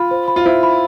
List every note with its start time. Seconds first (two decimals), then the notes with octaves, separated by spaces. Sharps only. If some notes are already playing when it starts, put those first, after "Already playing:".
Already playing: F4 B5
0.11 C5
0.28 B5
0.36 F4
0.45 E4 C5
0.63 B5